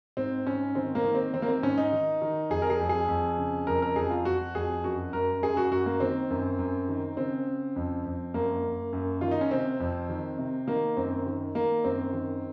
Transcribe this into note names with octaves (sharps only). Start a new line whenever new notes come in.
G#2 C4
G#2 C#4
D#3 C4
A#3
D#3
C4
D#3 C4
A#3
C4
G#2 C#4
D#4
D#3
D#3
F2 G#4
A#4
G#4
F2
G#4
F2
C#3
F2 A#4
A#4
F2 G#4
F4
F2 F#4
F2 G#4
F#2 F#4
F#2 A#4
F#2 G#4
F#4
F#2 F#4
A#3
D#3 C4
F#2
F#2
D#3
C#3 C4
C#3
F2
F2
F#2 A#3
F#2
F#2
D#3 F4
D#4
C#4
C3 C4
F2
D#3
C3
D#3 A#3
F#2 C4
D#3
D#3 A#3
F#2 C4
D#3